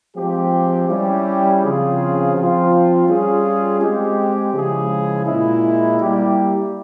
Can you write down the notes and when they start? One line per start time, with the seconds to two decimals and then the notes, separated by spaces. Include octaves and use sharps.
0.16 F3 G#3 C4 G4
0.89 G3 C#4 E4 G4
1.62 C#3 F3 C4 F4 G#4
2.35 F3 C4 F4
3.08 G3 C#4 F4 G#4
3.80 G#3 C4 G4
4.53 C#3 F3 G#3 E4 G#4
5.26 A#2 G#3 E4
6.00 G3 A#3 E4 G4